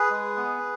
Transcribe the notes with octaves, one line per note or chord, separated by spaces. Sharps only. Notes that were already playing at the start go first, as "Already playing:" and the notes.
Already playing: G#4 B4
G#3
B3